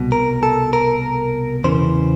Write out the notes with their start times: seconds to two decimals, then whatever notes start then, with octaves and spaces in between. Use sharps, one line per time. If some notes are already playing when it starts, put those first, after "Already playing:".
Already playing: C2 B2
0.12 A#4
0.43 A4
0.73 A#4
1.64 E2 C#3 E3 C5